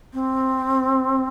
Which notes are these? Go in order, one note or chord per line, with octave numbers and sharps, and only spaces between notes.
C4